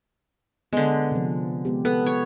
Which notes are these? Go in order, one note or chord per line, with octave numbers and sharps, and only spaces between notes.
D3 G#3 B3
C3 F3
G#3 B3 G4
B3 A4
C#5